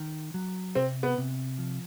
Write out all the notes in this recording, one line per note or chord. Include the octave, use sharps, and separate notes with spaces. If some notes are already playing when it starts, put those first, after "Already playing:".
Already playing: D#3
F#3
C3 C4
B3
C3
F3